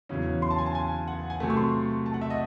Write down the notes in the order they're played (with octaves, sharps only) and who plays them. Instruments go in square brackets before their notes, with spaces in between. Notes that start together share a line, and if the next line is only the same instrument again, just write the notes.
[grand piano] E2 C#3 F#3 C#4
C6
A5
G#5
A5
G#5
F#5
G#5
C3 F#3 A3 A5
C#6
C6
A5
F#5
E5
D#5